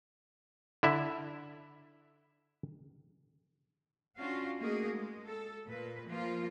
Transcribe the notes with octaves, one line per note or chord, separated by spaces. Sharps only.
D3 E4 E5
C#4 D4 F4 F#4 F5
A3 A#3 D#4 F#4 G#4 A#4
G#3
A4
A#2 B4
F3 A#3 F4